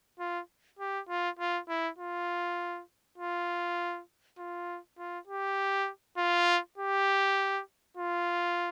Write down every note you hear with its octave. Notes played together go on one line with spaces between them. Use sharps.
F4
G4
F4
F4
E4
F4
F4
F4
F4
G4
F4
G4
F4